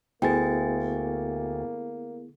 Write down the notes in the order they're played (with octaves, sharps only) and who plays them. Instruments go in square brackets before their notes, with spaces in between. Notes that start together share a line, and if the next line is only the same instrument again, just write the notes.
[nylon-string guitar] D2 [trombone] A#3 [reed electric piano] B3 E4 G#4 [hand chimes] G5 G#5 A6